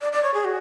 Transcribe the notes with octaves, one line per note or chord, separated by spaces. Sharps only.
D5
D5
C#5
G#4
F#4